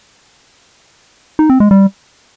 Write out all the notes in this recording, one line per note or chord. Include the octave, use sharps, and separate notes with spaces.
D#4
C4
G#3
G3